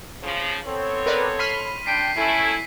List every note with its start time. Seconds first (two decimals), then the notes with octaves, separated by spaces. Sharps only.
0.23 C#3 F3
0.66 B3 C4 A4 C#5
1.06 A#4 B4 D5
1.39 B5 C6 F6 B6 D#7
1.86 D4 G5 B6 C7 D7
2.16 A3 C#4 E4 A4 G#5